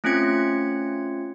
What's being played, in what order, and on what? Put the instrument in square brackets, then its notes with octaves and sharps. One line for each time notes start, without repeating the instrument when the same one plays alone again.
[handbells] A3 C4 C#4 F4 G#6 C#7